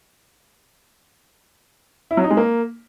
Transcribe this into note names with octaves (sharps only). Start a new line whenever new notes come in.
E4
F#3
D#4
G#3
A#3